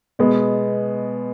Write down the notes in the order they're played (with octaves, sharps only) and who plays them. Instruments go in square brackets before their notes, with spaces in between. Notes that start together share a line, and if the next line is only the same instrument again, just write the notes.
[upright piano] B2 G#3 B3